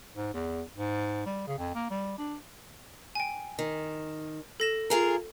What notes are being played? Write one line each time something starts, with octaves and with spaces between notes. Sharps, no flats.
G#2
E2
G#2
G3
C#3
F2
A#3
G3
D4
G5 G#5
D#3
A4 A#6 E7
F4 G#4 A#4